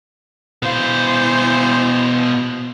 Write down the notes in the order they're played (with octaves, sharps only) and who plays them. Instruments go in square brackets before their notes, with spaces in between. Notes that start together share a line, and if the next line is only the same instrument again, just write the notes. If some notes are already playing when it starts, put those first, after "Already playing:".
[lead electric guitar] B2 F5 [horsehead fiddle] E4 C5